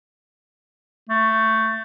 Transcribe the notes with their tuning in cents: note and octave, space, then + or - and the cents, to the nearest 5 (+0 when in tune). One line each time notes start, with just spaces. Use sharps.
A3 +15